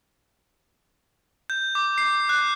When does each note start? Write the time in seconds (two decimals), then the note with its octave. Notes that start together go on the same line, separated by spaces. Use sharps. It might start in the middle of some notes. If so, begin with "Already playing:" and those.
1.50 G6
1.75 D6
1.98 C7
2.29 F#6